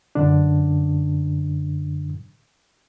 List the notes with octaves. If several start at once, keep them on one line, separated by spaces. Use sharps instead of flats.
F#2 D3 D4